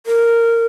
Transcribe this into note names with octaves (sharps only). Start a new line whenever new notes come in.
A#4